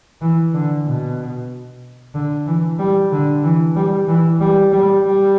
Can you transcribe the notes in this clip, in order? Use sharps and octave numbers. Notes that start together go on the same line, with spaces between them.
E3
D3
B2
D3
E3
G3
D3
E3
G3
E3
G3
G3
G3